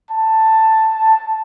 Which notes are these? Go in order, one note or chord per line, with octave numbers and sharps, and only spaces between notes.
A5